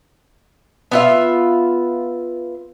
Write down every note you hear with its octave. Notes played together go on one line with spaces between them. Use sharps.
B3 F4 E5